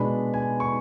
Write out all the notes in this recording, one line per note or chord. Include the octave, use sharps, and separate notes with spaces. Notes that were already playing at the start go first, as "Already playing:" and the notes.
Already playing: B2 G#3 D4 B5
G#5
C#6